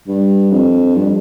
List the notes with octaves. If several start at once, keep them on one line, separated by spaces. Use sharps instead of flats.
G2
F2
G2